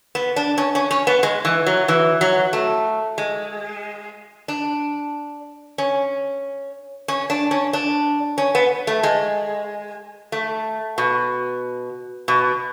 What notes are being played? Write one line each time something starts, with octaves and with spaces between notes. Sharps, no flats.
B3
D4
C#4
C#4
C#4
B3
G#3
E3
F#3
E3
F#3
A3
G#3
D4
C#4
C#4
D4
C#4
D4
C#4
B3
A3
G#3
A3
B2
B2